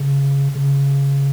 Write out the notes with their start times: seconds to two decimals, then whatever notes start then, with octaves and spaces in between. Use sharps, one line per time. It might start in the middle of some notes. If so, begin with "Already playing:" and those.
Already playing: C#3
0.55 C#3